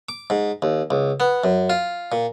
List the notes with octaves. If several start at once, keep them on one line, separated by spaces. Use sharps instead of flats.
D6
G#2
D#2
C#2
B3
F#2
F4
A#2